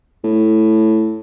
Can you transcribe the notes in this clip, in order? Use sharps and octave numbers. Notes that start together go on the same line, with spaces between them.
A2